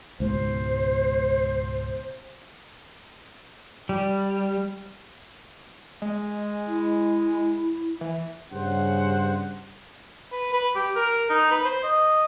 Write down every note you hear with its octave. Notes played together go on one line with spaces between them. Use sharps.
C#2 G#2 B2 C5
G3
G#3
E4
E3
G2 C#3 C5 F#5
B4
B4
G4
A#4
D#4
B4
C5
D#5